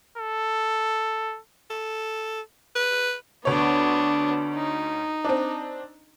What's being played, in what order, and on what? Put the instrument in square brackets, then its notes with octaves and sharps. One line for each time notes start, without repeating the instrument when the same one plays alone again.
[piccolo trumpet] A4
[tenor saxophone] A4
B4
[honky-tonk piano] D2 C#5 [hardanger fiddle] B3 D4
[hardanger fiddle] D#4
[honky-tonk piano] C4 D4